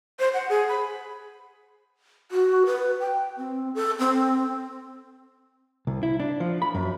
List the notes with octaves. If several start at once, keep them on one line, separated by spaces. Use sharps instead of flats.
C5
F#5
G#4
B5
F#4
B4
G5
C4
A4
C4
C2
E4
D4
F3
B5
F#2